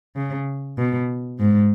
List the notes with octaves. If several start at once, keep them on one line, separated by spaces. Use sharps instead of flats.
C#3
B2
G#2